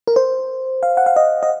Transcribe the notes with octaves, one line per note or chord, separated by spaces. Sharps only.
A#4
C5
F5
F#5
F5
D#5
D#5